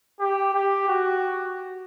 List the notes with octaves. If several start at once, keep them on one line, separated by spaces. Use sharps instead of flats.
G4
G4
F#4